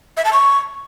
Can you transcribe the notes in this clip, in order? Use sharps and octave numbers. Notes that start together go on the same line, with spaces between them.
E5
A5
C#6